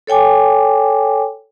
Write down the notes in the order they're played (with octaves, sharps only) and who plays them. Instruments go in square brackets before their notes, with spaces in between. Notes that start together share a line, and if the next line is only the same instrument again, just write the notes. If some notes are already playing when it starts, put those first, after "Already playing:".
[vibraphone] A4 C#5 G5 G#5 D6